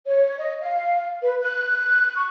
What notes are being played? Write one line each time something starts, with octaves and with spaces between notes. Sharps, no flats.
C#5
D#5
F5
B4
F#6
C#6